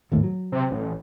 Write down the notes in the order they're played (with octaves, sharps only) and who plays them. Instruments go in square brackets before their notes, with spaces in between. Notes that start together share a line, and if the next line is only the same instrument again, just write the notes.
[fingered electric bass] G#1 D#2 A2
F#3
[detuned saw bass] C3
A1